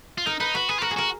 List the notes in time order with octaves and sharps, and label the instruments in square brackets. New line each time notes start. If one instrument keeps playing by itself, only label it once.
[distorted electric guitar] F4
[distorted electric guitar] D#4 [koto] A#4
[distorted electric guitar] D#4 [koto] B4
[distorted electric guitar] F#4 [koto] B4
[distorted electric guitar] G#4 [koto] B4
[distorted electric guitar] F4
[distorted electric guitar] F#4 [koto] A#4
[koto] G#4
[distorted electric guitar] F#4 [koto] A#4